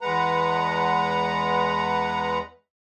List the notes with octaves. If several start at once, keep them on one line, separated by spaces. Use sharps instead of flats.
E2 G#3 B4 F#5 A#5